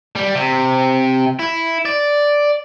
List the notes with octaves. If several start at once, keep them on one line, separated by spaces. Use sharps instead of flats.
G3
C3
E4
D5